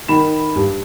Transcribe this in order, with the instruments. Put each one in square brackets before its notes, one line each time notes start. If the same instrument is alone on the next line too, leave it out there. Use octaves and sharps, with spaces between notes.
[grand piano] D#3 B5 E7
G2